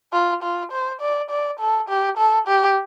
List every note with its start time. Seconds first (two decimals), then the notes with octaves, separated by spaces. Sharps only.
0.13 F4
0.43 F4
0.72 C5
1.01 D5
1.30 D5
1.60 A4
1.89 G4
2.18 A4
2.47 G4